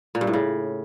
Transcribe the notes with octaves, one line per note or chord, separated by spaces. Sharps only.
A#2
G2
A2
C#3